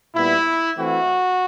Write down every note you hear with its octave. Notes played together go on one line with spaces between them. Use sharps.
A#2 G3 B3 E4
E3 A3 C4 E4 F#4